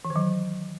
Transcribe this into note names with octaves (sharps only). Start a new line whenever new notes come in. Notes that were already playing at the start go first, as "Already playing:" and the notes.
E3
D#3
F#3